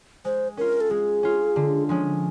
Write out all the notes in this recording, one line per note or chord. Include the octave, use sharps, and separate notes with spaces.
G#3 C5
C#4 F4 A#4
A4
G#3 G#4
C#4 F4
D3
F3 G#3 C#4